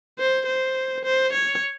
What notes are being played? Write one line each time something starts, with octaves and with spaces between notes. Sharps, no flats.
C5
C5
C5
C#5